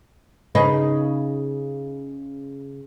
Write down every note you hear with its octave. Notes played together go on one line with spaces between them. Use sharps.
C#3 D#4 B4